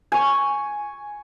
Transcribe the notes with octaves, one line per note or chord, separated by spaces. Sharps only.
G#5 C#6